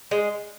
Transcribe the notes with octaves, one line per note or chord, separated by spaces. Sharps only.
G#3